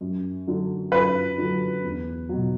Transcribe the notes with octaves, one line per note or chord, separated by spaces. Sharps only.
F#2
D3 F#3
F#2 B4
D3 F#3
E2
B2 F#3